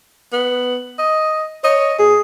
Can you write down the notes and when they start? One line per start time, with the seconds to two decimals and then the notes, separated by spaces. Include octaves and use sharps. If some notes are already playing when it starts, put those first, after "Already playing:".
0.32 B3
0.99 D#5
1.64 C#5 D#5
1.99 B2 G#4